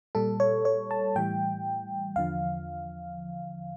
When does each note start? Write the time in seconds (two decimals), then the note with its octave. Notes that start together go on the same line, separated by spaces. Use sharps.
0.15 A#2 G3 A4
0.40 C#5
0.65 C#5
0.91 A5
1.15 A2 E3 G3 G5
2.16 E2 D3 F3 F5